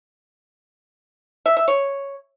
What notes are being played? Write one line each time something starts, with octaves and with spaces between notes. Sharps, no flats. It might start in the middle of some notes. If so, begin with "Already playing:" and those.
E5
E5
C#5